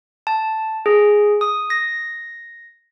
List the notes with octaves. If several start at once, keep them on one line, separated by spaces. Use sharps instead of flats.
A5
G#4
D#6
A#6